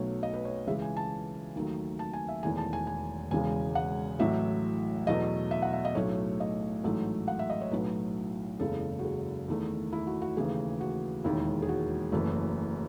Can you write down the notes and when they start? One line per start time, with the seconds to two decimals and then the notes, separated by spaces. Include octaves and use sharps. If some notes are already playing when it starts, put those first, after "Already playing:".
Already playing: B1 B2 F#3 A3 C#5
0.23 D#5
0.34 B4
0.45 C#5
0.56 C#5
0.66 C#2 C#3 E3 G#3 E5
0.82 G#5
0.97 A5
1.56 D#2 D#3 F#3 A3
1.99 A5
2.13 G#5
2.28 E5
2.43 E1 E2 D#3 A3 G#5
2.57 A5
2.73 G#5
2.87 G#5
3.31 E1 E2 C#3 G#3 G#5
3.75 F#5
4.19 A1 A2 F#3 E5
5.07 E2 B2 F#3 A3 D#5
5.51 E5
5.62 F#5
5.73 E5
5.85 D#5
5.95 B1 A2 F#3 A3 C#5
6.40 D#5
6.84 A1 G#2 F#3 A3
7.28 F#5
7.39 E5
7.50 D#5
7.61 C#5
7.71 B1 A2 F#3 A3 B4
8.60 F#1 E2 C#3 G#3 A4
8.99 F#4
9.05 G#4
9.48 E2 D#3 A3
9.93 E4
10.07 F#4
10.22 F#4
10.36 D#2 C#3 E3 A3 G#4
10.81 F#4
11.24 E1 D#2 D#3 G#3 E4
11.62 G#4
11.69 F#4
12.12 F#1 F#2 E3 A3